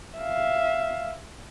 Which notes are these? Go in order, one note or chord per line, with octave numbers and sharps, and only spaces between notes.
E5 F5